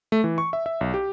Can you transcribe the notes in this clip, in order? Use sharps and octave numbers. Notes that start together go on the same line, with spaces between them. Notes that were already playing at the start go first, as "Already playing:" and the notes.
A3
E3
C#6
E5
E5
B1
G4